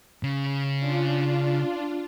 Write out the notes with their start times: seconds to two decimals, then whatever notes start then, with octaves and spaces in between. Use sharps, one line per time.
0.23 C#3
0.80 D4 F4